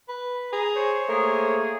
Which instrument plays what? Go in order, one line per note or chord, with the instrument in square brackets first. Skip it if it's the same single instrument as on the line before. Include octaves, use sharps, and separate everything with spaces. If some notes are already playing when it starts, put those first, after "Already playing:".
[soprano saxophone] B4
[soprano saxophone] G#4 [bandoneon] A#5
[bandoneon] C5 C#5
[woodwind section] A3 A#3 G#4 [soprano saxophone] A#4